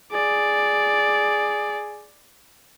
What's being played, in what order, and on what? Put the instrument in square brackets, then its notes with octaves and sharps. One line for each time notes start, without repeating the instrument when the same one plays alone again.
[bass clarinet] G#4 [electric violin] D5